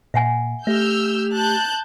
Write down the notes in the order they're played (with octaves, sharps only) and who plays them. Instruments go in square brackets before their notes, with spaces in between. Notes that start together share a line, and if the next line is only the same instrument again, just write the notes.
[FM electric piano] A#2 [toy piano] E5 F#5 G#5
[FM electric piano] A3 [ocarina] G4 [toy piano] E5 [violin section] E6 F6 G6
[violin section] A5 F#6 G6